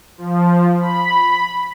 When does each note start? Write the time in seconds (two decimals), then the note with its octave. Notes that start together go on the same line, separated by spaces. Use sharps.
0.18 F3
0.80 B5